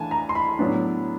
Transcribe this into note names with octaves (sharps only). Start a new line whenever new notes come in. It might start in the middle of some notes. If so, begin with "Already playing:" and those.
Already playing: E3 A3 D4 G#5 A5
A#5
C6
B5
A2 F#3 B3 D4